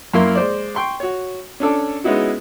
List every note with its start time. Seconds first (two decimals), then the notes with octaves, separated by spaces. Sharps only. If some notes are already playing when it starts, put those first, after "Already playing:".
0.14 F#2 A#3 E4 A#4 C6
0.35 G#3 C5 D5
0.75 G5 C6 C#6
1.00 F#4 C#5
1.60 C#4 D4 A4 D5
2.04 G#3 B3 C#4 D#4 E4 F#4